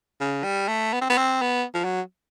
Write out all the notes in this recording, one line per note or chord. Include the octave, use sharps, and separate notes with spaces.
C#3
G3
A3
B3
C4
B3
C4
B3
F3
F#3